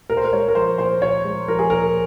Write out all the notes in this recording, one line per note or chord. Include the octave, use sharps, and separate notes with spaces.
A#2 A#4
C5
A#4
G#3 C#5
A#4
F3 C5
A#2 C5
A#2 C#5
G#3
F3 A#4
G#4
A#2 A#4